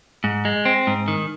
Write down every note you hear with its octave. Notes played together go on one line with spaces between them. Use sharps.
G#2
G#3
C4
G#2
D#3